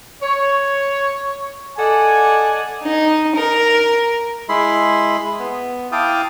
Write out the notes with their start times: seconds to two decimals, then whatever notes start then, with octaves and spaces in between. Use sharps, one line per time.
0.23 C#5
1.78 A4 D5 D#5 F#5 G#5
2.83 D#4
3.35 A#4
4.49 G#3 E4 B5 C6
5.39 B3
5.92 E4 F5 G5 A5 D6 D#6